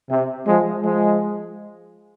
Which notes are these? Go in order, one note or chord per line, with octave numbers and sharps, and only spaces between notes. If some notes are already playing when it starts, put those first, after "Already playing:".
C3
F3 G#3
F3 G#3